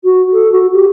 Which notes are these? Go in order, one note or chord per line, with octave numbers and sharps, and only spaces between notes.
F#4
A4
F#4
G4